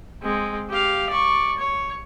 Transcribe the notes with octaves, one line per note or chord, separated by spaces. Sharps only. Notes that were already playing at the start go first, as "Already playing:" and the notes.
G#3 C4
G4 F5
D5 C#6
C#5